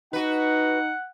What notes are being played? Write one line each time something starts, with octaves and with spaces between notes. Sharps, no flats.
D#4 F#4 B4 F#5